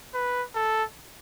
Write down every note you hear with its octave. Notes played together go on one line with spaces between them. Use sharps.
B4
A4